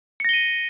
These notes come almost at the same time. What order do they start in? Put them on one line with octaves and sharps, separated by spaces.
C#7 A#6 G7 D#7